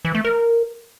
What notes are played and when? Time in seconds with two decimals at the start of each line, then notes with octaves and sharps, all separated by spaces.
0.05 E3
0.15 A3
0.25 A#4